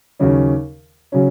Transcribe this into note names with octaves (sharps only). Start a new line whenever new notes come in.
D#2 C#3 F#3 C#4
C#3 F#3 C#4